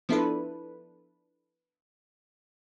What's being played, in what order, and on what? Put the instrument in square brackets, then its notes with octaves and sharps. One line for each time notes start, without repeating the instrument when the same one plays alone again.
[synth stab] F3 B3 D4 E4 A4 B4